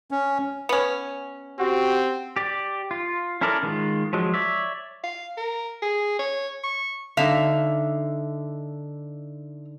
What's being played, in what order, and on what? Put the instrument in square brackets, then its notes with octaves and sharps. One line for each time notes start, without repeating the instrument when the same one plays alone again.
[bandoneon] C#4
[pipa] B3 C#4
[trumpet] C4 [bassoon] F#4 [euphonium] G4
[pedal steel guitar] G4 D5
F4
C#4 E4 A4 A#4 D5
D#3 G#3 F4
F3 F#3 G#3
C#5 D5 E5
[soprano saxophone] F5
A#4
G#4
C#5
C#6
[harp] D3 D#4 [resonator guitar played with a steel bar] E5 F5